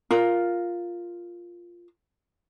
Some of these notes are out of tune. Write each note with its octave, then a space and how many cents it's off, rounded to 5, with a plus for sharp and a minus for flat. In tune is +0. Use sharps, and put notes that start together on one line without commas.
F4 +0 A#4 +0